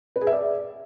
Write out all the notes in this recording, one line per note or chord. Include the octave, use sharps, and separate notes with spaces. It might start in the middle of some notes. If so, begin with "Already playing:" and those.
B4
G#4
E5
D5